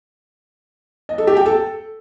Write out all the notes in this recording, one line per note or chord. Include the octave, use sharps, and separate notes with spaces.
D#5
A4
G4
G5
A4